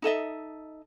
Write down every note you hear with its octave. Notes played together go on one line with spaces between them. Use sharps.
D#4 A4 D#5 E5